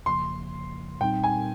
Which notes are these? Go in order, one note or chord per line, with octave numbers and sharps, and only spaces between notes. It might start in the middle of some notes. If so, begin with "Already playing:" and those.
G1 F2 C#3 F3 A#3 C6
A#2 G3 C4 D#4 G5
G#5